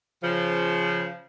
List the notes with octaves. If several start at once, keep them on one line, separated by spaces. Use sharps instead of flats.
C#3 F3